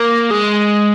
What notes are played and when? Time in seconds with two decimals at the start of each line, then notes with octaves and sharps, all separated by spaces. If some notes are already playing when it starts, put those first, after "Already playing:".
Already playing: A#3
0.31 G#3